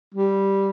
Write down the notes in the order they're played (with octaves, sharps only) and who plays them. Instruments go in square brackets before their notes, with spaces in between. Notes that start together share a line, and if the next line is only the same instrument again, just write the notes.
[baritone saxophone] G3